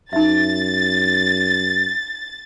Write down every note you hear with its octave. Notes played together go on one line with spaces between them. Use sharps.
F#2 D#4 E5 A6